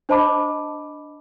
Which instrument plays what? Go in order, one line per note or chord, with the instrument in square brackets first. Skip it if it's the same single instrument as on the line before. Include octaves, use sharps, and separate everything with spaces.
[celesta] D4 C5 D#5 A5 B5 D6